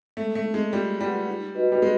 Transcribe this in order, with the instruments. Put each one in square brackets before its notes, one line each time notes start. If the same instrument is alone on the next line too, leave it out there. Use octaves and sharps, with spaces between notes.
[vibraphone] G#3 [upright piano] A3
[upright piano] A3
[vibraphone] C4 D#4
[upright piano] G#3
[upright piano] G3 [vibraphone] F4
[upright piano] G3 [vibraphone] G#4 B4 D5 F#5
[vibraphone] D#4
F#4 B4 D#5
[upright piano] G3
G#3